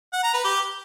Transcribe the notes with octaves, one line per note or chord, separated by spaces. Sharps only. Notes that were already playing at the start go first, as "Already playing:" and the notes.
F#5
A#5
B4
G4